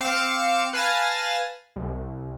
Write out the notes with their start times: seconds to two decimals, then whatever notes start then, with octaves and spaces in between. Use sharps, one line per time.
0.01 C4 F5 D6 C#7 E7
0.73 B4 F5 G#5 A5 A6 A#6
1.76 C2